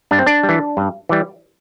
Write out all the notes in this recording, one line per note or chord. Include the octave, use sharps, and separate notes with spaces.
G2 D4
C4
D4
G3
E3
G2
E3 G3